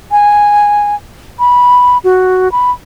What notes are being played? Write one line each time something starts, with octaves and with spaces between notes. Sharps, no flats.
G#5
B5
F#4
B5